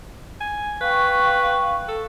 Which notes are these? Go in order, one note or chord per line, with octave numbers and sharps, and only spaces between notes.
G#5
B4 F5 G5 C#6
A4